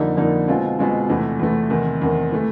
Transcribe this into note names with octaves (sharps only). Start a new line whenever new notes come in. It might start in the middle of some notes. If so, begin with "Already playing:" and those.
Already playing: F2 D3 G3 A#3 D#4
F2 D3 G3 A#3 D#4
B2 G#3 C4 F4
B2 G#3 C4 F4
E2 C3 E3 A3
E2 C3 E3 A3
E2 C3 D#3
E2 C3 D#3
E3 A3